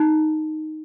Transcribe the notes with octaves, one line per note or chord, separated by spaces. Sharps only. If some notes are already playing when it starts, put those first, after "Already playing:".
Already playing: D#4